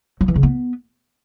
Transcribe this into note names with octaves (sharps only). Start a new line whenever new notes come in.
F#3
E3
C#3
B3